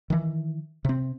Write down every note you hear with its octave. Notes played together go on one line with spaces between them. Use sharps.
D#3 E3
C3 C4